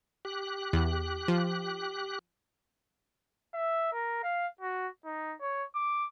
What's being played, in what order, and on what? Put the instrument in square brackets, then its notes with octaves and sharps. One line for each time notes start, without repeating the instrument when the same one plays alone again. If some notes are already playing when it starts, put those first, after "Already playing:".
[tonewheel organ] G4 F#6
[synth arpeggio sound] E2
F3
[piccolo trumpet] E5
A#4
F5
F#4
D#4
C#5
D6